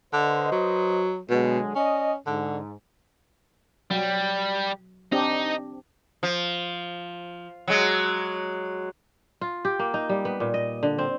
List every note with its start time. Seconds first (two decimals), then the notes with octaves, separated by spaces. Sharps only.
0.13 D3 B4 C5 D#5
0.52 F#3
1.30 B2 D3 F#3 G#3
1.76 C#4 D5 D#5
2.27 G#2 D3
3.90 F#3 G3
5.12 C4 D4 D#4 G4
6.23 F3
7.68 F#3 G#3
9.41 F4
9.65 G4
9.79 A#3
9.94 D#4
10.09 G3
10.25 B3
10.40 A#2
10.54 D#5
10.83 D3
10.98 C4